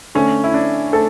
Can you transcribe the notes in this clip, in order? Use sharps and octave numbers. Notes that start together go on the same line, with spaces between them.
D3 A3 C#4
E4
D4
A3 A4